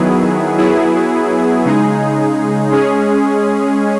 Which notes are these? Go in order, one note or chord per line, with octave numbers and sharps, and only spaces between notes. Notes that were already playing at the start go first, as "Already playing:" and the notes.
Already playing: D#3 F#3 B3 E4 G#4
F#3 B3 E4 G#4
C#3 G#3 D#4 G#4
G#3 C#4 G#4